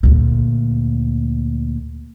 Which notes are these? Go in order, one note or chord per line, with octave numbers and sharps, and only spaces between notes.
D2 A#2